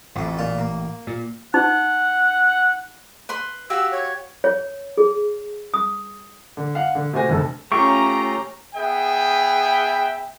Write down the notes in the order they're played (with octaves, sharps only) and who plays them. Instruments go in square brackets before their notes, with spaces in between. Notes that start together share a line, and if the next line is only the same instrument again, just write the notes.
[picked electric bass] A1 [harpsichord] F2 A3
[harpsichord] A#2 F4 A5
A#3
[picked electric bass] A#2
[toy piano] D#4 [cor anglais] F#5
[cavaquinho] B4 B5 C6
[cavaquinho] F#4 G4 F5 [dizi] E6
[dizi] C#5
[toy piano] C#5
G#4
D#6
[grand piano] D3
F5 F#5
D3
C3 A3 F#4 C5 G#5 A#6
F1 D2 A4
[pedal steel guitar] A3 F4 G4 [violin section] C#4 A#5 [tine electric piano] C#6
[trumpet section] B3 G#4 E5 G5